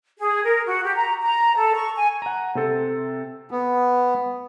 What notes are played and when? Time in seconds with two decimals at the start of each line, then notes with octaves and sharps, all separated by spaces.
0.18 G#4
0.43 A#4
0.66 F#4
0.84 G4
0.96 A#5
1.22 A#5
1.56 A4
1.75 C#6
1.96 G#5
2.22 F#5 A#5
2.55 C3 C4 A4
3.51 B3